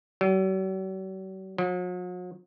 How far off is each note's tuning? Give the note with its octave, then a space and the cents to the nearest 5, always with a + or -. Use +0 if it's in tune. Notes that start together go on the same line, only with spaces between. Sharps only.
F#3 +45
F#3 -45